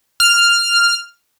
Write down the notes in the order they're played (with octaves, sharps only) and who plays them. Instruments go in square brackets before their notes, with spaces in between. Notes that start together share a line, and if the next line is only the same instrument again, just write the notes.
[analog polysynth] F6